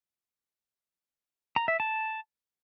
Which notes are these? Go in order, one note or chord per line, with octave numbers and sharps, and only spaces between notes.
A#5
E5
A5